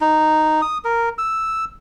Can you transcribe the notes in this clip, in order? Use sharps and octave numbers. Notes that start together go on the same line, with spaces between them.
D#4
D#6
A#4
E6